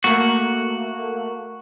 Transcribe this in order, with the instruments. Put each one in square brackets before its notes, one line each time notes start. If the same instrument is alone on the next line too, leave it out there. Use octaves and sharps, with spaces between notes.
[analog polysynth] A3 A#3 [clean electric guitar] F#4